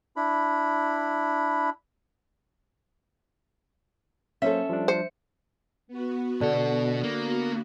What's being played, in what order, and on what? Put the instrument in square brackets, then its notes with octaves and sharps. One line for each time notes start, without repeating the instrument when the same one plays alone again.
[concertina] D4 E4 B5
[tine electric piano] F#3 A#3 C5 [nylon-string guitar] C#4 A4 [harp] E5
[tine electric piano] F3 G3 D4
[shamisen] C5 [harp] C#7
[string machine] B3 F#4
[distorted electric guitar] B2 F#5 [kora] D3
[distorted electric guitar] A#3